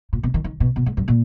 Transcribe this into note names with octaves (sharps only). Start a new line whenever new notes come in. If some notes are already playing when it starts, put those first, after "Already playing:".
A#2
B2
D#3
D#3
B2
B2
G#2
F#2
A#2